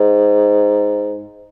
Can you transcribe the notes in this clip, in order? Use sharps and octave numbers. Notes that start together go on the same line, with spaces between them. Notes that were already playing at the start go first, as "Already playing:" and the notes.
Already playing: G#2